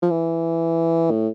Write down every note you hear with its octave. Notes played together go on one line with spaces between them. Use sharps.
F3
E3
A2